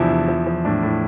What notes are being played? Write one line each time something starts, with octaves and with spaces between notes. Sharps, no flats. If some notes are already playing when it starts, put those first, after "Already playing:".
Already playing: E2 C3 F3 D4 E4
E2
F3
F3
A2 D4
A2